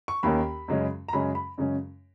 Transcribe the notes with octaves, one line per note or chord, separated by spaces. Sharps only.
C#6
D#2 D#3 A#3 C#4 B5
F#2 C#3 G#3 C#4
A#5
F#2 C#3 G#3 C#4 B5
B5
F#2 C#3 G#3 C#4